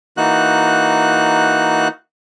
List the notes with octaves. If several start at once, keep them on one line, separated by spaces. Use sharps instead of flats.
E3 A#3 D#4 F#4 F#6